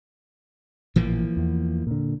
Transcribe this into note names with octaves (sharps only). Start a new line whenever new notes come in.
A1 A#2 E3 F3 A#3
E2
A#2 D3